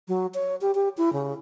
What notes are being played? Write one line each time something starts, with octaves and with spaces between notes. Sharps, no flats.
F#3
C#5
G4
G4
E4
C#3